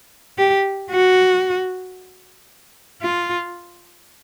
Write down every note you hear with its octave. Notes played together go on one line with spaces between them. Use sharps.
G4
F#4
F4